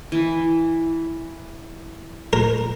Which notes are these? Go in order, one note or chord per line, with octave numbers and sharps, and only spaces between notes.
E3
A#4